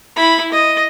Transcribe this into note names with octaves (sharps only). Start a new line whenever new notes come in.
E4 B5
D#5